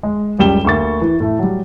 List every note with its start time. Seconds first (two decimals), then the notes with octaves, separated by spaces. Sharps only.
0.03 G#3
0.39 C#2 F#2 G3 G5 E7 G7
0.65 D2 A#3 C#6 A6
1.01 E3
1.20 A2 A3
1.39 F#3 G3